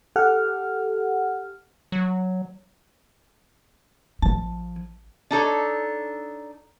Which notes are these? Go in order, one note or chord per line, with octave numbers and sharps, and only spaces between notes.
G4 A4 F#5 F6
F#3
A1 F3 A5
D4 D#4 A4 C#5